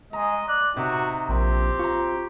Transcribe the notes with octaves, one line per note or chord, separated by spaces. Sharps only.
G#3 D#5 A#5
D5 F#6
C3 D#4 F#4 D6
A#1 C4 G4
F4 A#5 C#6